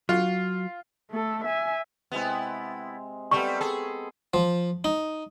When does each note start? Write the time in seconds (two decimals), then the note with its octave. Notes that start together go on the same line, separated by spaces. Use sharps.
0.09 F#3 F4
1.11 A3 A4
1.45 E5 G#5
2.12 C3 G#3 B3 C4 E4
3.31 G3 A3 B3 C4 C#6
3.61 G#4 A4
4.34 F3
4.84 D#4